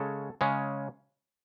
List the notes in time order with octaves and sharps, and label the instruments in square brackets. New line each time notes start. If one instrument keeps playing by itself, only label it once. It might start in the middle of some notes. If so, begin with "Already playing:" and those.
Already playing: [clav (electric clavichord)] C#3 G#3 C#4 A4
C#3 G#3 C#4